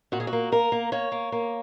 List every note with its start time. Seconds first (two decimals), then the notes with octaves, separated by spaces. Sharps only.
0.12 A#2 F#4
0.20 G#4
0.27 F#4
0.33 A#3
0.52 A#3 A#4
0.72 A#3
0.92 A#3 C#5
1.12 A#3
1.32 A#3